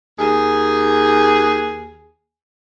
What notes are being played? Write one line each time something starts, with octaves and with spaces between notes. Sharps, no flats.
D#2 G#4